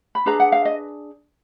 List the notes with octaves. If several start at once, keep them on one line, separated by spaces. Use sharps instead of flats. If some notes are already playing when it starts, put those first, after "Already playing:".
B5
D4 G#4 B4 A#5
F#5
F5
D#5